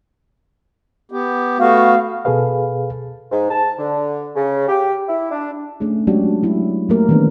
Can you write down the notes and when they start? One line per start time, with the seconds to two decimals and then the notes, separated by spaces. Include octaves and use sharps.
1.12 B3 G4
1.59 A3 B3 F#4 F5
2.25 B2 G#4 A4 B4 F5
3.31 G#2
3.50 A5
3.77 D3
4.35 C#3
4.68 G4
5.08 E4
5.31 D4
5.80 A3 C#4 D4 G#4
6.07 F#3 G#3 C#4 D4 F#4 G4
6.43 F#3 A3 D4 E4
6.89 F#3 A3 A#3 G4 A#4
7.09 D#3 E3 B3 C#4 D4